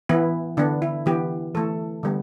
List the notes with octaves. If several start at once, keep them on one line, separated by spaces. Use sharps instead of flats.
E3 B3 E4
D3 B3 D4
E4
E3 B3 G4
E3 A3 A4
D3 G3 B3